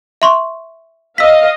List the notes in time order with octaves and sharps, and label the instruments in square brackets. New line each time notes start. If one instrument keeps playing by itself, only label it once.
[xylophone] E5 C6 C#6
[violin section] D#5 F5 [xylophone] E6 B6